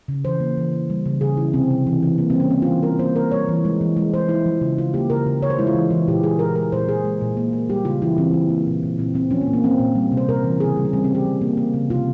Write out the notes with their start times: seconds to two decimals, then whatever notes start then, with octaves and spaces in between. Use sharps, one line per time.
0.08 C#3
0.25 E3 C5
0.40 A#3
0.57 E3
0.73 A#3
0.90 G3
1.06 C#3
1.21 C#3 G#4
1.37 E3 E4
1.53 C3 C4
1.70 C3
1.87 E3
2.03 E3
2.18 A#3
2.30 C4
2.35 G3 C#4
2.51 A#3 C4
2.62 F4
2.67 E3
2.83 G3 A#4
2.99 A#3 C5
3.16 A#3 A#4
3.31 G3 C#5
3.49 E3
3.65 G#3
3.81 E3
3.97 G#3
4.14 G#3 C5
4.29 F3 E4
4.46 F3
4.61 C#3
4.78 C#3 F4
4.94 A#3 G4
5.10 C#3 A#4
5.27 C#3
5.42 C#3 C#5
5.50 C5
5.59 G#3 E4
5.67 F4
5.75 E3
5.91 E3
6.08 A#2 G4
6.23 G#3 G#4
6.39 A#2 A#4
6.55 G#3 A#4
6.72 A#2 C5
6.88 A#2 G#4
7.05 G#3
7.21 A#2
7.37 A#3
7.53 A#3
7.69 G3 G4
7.85 C#3 F4
8.02 E3 E4
8.18 E3 C4
8.33 E3
8.50 A#3
8.67 A#2
8.83 A#2
8.98 A#2 C4
9.14 A#2 C4
9.31 F3 C#4
9.41 A#3
9.47 A#2
9.53 A#3
9.64 F3 C4
9.79 A#2
9.95 G3
10.12 C3
10.17 C5
10.29 C3 A#4
10.44 E3
10.60 C#3 G#4
10.77 G3
10.85 C#4
10.93 G3 C4
11.04 C4
11.09 C#3
11.15 G4
11.25 F3
11.41 A#3
11.57 A#3
11.74 C#3
11.90 C3 F4